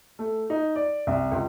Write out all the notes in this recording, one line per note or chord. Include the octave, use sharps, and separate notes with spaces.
A3
D#4
D5
C2
C#2